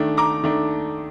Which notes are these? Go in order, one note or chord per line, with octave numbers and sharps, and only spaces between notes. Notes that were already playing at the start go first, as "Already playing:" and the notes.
Already playing: D#3 A3 D4
A#5 D6
D#3 A3 D4